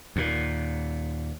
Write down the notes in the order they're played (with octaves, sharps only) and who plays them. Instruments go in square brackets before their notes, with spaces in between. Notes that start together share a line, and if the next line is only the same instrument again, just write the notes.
[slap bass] D#2 A#2